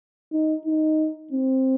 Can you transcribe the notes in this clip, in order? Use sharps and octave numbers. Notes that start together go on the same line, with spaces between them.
D#4
D#4
C4